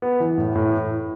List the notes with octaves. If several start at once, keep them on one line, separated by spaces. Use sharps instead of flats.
B3
E3
A2
A2